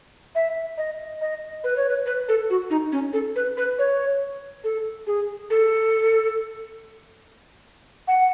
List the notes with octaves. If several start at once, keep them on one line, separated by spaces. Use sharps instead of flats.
E5
D#5
D#5
B4
C#5
B4
B4
A4
F#4
D#4
C#4
A4
B4
B4
C#5
A4
G#4
A4
F#5